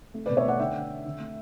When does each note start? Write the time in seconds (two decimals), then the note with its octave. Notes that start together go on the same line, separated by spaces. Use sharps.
0.14 A3
0.26 B4 D5
0.29 B2
0.37 C#5 E5
0.45 A3 D5 F#5
0.60 D3 E5 G5
0.75 D3
0.90 D3
1.06 D3
1.20 A3